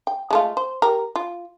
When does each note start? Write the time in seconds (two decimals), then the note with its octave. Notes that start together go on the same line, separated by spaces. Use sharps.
0.07 G5
0.31 G#3 A3 F4
0.57 C5
0.82 G4 A#4
1.16 F4